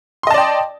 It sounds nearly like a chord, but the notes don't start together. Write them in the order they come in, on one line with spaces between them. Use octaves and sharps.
C6 D#5 A5 D5 G5